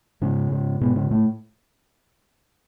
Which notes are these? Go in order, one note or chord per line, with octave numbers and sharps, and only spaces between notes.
G#2 C#3 C#4
G#2
G#2 B2 B3
C#3 C#4
A2 A3